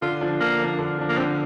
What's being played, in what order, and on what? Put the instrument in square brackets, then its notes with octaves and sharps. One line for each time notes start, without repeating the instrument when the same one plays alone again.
[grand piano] D3 [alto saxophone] F4
[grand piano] F3 D4
[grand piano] D3 [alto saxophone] A#3
[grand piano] F3 D4
D3
F3 D4
[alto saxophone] A#3
[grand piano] D3 [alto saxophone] C4